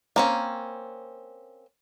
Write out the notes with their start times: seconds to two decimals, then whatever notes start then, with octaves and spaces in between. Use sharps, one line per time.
0.16 A#3 C4 C#4